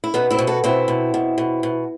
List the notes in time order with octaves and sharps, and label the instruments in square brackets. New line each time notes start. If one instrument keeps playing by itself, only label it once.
[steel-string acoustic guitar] E4
B2 B3 D#4
C4 E4
B2
F#4 A4
B2 C4 E4
B2
B2
B2
B2